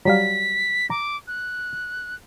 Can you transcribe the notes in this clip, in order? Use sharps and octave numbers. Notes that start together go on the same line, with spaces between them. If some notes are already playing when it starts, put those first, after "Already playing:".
F#3 G3 F5 B6
A#5 D6
F#6